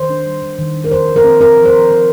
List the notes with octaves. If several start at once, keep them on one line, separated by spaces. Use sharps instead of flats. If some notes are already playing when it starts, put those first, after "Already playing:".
Already playing: D#3 C5
D4
G3
D#3
D#3
D4
A#4
F3 C5
F3
A#4
C4
C4 A#4
F3
C5
F3
F3